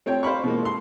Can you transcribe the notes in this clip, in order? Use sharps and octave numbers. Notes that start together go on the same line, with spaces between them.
A3 C4 C#5 G5
C5 F5 B5 C#6
B2 E3 G#3 A#3
A4 C6